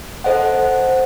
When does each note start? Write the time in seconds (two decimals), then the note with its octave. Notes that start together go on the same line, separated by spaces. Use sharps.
0.24 A4 C5 D#5 F#5